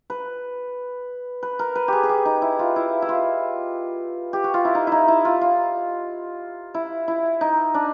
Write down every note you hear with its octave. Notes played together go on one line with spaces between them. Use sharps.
B4
B4
A#4
B4
G4 G#4
G#4
G4
D#4
E4
F4
E4
E4
F4
G4
F#4
F4
E4
D#4
D#4 E4
E4
F4
F4
E4
E4
D#4
D4